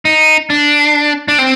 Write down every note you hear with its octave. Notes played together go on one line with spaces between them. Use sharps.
D#4
D4
D4
C4